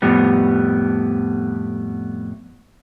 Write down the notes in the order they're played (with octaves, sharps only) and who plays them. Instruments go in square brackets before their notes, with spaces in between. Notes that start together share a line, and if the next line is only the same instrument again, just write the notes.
[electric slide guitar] F2 A2 G3 B3